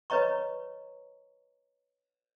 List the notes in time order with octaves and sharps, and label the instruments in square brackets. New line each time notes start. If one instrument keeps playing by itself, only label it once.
[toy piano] B4 C#5 D#5 A#5 C#6